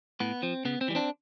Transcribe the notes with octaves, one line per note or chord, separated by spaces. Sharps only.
A2 B3
F3 C4
C#3 B3
C4
E3 G3
C4 D4